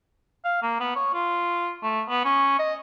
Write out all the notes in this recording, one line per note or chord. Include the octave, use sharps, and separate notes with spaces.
F5
A#3
B3
C#5
F4
A3
B3
C#4
D#5